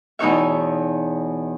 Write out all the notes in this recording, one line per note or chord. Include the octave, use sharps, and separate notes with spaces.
E2 B2 D#4 C#5 E5